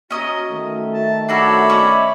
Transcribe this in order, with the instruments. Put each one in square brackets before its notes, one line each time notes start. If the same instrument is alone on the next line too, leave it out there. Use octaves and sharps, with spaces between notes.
[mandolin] C#4 D#5 A#5 [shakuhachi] F#4
[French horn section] D#3 A3
[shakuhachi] E5 [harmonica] A5
[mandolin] D4 F#4 A4 [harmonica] C#5 D5 B5
[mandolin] C#4 E4 [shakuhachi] D#5